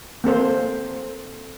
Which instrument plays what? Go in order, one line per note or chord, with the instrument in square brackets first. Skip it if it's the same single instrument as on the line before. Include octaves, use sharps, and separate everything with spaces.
[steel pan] A#3 C4 A4 C5